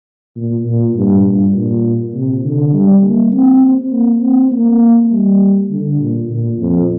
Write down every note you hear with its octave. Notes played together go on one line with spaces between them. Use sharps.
A#2
A#2
G2
G2
A#2
C3
D3
G3
A#3
C4
A#3
C4
A#3
G3
D3
A#2
A#2
F2